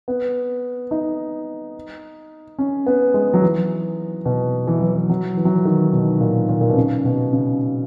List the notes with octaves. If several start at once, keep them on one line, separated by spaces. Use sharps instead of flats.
B3
D#4
C#4
B3
G#3
F#3
E3
B2
E3
F#3
E3
F#3
E3
F#3
E3
D#3
B2
A#2
A#2
A#2
B2
C#3
B2
C#3